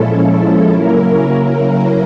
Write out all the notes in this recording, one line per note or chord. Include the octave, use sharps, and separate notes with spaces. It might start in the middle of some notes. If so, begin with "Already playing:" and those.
Already playing: A#2 F3 G#3 C#4 E4 A4
C#3 F#3 A#3 C#4 E4 A#4